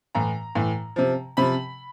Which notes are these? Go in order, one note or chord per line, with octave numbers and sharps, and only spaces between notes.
A2 E3 A#5
A2 E3
C3 F3
C3 F3 B5